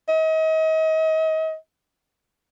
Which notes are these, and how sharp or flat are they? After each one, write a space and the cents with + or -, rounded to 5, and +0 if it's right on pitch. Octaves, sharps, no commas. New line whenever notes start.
D#5 +35